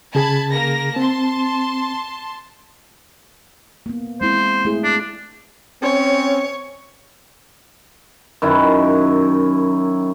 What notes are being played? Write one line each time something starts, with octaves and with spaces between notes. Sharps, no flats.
C#3 G#4 A5 B5 G#6
A#3 A#4 A#6
C4 A5 C6
A#3 B3
G#3 C4 E4 C5
A3 E4 G#4
D4
C4 C#4 C#5
F#2 D#3 E4